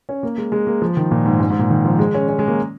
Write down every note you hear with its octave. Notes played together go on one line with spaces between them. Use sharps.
C#4
A#3
G#3
G#3
A#3
F3
D#3
A#2
G#2
G#2
G#2
A#2
D#3
F3
G#3
C#4
C#4
G#3
A#3